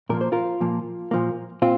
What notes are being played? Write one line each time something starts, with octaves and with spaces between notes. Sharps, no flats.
A#2 F3 A#3 A#4
C5
F4 A#4
A#2 F3 A#3
A#2 F3 A#3
A#2 C4 F4